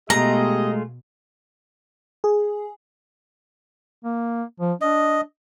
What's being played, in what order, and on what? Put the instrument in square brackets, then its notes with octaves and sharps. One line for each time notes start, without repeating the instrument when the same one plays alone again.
[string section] B2 [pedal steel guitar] G#3 A3 F4 [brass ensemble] G4 G#4 D#5 [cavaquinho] A#5
[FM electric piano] G#4
[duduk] A#3
F3
[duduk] D4 [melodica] D#5